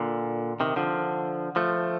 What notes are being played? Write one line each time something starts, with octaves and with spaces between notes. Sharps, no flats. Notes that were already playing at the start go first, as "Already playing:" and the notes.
Already playing: A#2 D3
C3 D#3
D3 F3
F3 A3